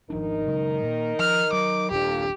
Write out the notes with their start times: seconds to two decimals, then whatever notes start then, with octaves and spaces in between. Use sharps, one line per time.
0.10 G#1 D#3 F3 D4 D#4 A#4
0.46 C#3 F#3 G#3
0.83 A#2
1.19 F3 F6
1.53 F#3 D6
1.91 D#1 F2 A#2 A#3 D4 G4